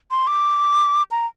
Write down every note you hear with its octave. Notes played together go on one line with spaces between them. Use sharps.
C6
D6
A#5